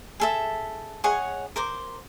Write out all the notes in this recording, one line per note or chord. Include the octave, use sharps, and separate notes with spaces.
G#4 A4 E5
G#4 C#5 D#5 F#5
A#4 C5 D6